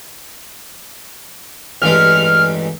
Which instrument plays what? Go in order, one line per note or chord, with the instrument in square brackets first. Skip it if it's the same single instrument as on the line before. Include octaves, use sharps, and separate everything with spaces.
[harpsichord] A1 G2 G#3 [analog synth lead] F6